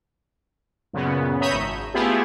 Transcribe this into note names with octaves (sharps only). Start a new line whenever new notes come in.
F#2 A#2 C#3 B3
C#5 E5 A#5 B5 D#6 G6
G#1
A3 B3 E4 F4 G4 G#4